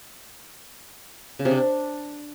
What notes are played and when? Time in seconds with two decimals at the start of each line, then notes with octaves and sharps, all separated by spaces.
1.39 C#3
1.45 C3
1.51 D4